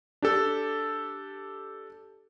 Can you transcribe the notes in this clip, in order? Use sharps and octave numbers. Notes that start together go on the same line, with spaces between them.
D4 G4 A4